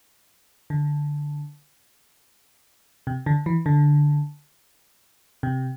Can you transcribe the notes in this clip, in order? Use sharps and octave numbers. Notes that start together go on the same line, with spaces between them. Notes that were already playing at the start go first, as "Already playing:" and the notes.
D3
C3
D3
E3
D3
C3